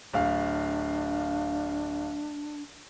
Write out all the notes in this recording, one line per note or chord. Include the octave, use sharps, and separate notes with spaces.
D1 D4 F5